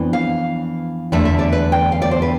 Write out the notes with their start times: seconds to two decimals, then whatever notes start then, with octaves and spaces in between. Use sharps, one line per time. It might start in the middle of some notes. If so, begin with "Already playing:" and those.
Already playing: F2 E3 B3 D4
0.13 F5
1.12 E2 D3 A3 D4 E5
1.25 E5
1.39 D5
1.52 B4
1.72 G5
1.92 F5
2.02 D5
2.11 C5
2.22 B4